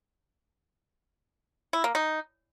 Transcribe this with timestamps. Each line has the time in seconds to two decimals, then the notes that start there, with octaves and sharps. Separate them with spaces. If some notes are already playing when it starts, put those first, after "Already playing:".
1.73 E4
1.84 A#3
1.95 D#4